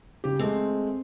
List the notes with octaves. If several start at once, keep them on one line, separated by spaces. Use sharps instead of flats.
C#3 G4
G#3 A3 C4